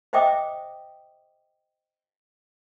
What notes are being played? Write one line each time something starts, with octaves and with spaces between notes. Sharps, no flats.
C5 D#5 E5 G5 D6 D#6